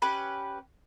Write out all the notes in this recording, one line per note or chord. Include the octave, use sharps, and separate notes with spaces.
C#4 G4 B4 B5